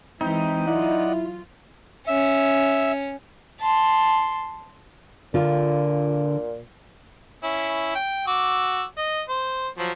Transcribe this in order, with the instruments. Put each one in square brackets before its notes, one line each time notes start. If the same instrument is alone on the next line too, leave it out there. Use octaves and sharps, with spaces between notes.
[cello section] E3 G#3 E4 [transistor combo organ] C4 G5 [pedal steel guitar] D#4
[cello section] F#3 F4 [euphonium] E4 [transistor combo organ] D5 D#5 F#5
[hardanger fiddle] C#4 [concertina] E5
[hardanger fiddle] A5 C6
[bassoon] A#2 [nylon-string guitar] D3 F4
[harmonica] C#4 E4
G5
F#4 D6 E6
D#5
C5
F3 F#3